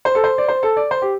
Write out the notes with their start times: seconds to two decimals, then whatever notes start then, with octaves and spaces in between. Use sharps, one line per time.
0.05 C5
0.15 A4
0.24 C5
0.38 D5
0.48 C5
0.63 A4
0.77 D5
0.91 C5
1.02 G4